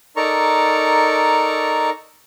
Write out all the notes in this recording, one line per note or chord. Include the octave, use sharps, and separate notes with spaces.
D#4 A4 A#4 D5 A#5 C#6